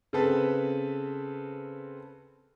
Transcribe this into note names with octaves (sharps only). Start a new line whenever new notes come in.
C#3 C4 A4 B4